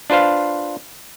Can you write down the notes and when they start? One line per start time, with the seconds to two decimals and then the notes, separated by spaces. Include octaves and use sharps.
0.10 D4 F4 B4 C5 F5